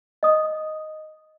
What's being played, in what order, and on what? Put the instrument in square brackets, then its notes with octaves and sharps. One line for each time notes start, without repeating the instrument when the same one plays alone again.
[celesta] D#5 D#6